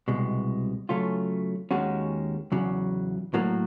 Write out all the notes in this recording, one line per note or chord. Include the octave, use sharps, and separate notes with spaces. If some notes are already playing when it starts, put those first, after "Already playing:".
C2 B2 G#3
C#3 F#3 A3 C#4 F4
D#2 D#3 G#3 C#4 F#4
E2 C#3 F#3
A2 F#3 A#3